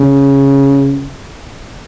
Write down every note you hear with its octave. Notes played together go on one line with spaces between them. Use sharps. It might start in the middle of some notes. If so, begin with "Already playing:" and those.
Already playing: C#3